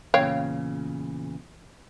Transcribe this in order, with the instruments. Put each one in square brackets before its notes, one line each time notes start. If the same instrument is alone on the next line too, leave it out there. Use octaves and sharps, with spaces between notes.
[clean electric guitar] E2 A#2 C#3 [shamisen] C#5 F5 G5